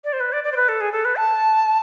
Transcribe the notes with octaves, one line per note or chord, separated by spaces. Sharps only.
D5
C5
B4
D5
D5
C5
B4
A4
G#4
A4
B4
A5